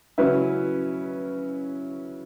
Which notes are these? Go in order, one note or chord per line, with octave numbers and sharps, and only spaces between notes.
C#3 F#3 C#4 E4 B4